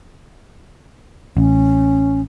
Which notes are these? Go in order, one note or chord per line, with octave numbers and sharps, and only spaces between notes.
A1 C#4